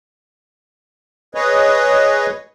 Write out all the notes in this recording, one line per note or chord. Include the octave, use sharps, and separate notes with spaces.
G#4 B4 C#5 D#5